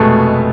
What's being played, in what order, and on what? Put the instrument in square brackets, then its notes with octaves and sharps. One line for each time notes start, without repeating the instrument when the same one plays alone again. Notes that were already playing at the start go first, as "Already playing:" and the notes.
Already playing: [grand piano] F1 B2 G#3 A3 B3